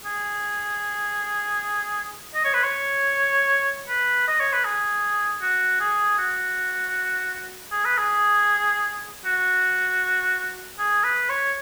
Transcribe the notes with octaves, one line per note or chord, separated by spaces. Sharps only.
G#4
D#5
C#5
B4
C#5
B4
D#5
C#5
B4
G#4
F#4
G#4
F#4
G#4
B4
G#4
F#4
G#4
B4
C#5